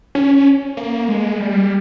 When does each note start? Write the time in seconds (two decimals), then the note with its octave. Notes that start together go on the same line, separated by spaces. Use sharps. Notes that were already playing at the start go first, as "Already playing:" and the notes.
0.15 C#4
0.77 A#3
1.09 G#3
1.40 G3